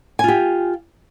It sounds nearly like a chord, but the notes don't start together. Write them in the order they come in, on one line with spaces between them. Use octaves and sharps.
G#5 F4 G4